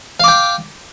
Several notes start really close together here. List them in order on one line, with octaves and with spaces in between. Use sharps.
F5 D6 G5